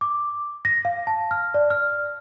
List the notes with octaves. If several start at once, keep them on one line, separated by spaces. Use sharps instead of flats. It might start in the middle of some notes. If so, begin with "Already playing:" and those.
D6
A#6
F5
A5
F6
D5
F6